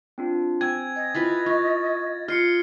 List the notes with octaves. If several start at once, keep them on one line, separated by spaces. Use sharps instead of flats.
C4 D4 F4
C4 G5 G#5 E6 G#6
D#5
E4 F4 B4 A6
F4 C#6
F4 D#5 C6 F6 C7 C#7